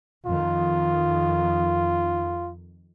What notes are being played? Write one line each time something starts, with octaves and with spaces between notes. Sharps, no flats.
F2 D#3 F4